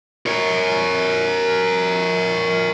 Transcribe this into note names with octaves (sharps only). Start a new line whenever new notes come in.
A#4 C#5